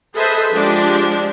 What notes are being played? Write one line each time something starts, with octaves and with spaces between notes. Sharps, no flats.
G#4 A4 B4 C5 D#5 E5
F3 G#3 D4 G4 D5